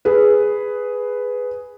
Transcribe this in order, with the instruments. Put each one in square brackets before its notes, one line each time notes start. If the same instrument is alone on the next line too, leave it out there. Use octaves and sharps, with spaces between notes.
[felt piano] G#4 B4